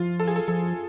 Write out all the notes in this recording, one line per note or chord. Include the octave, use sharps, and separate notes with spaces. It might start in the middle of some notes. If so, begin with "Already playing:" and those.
Already playing: F3 F4
A4
G#4
A4
F3 A4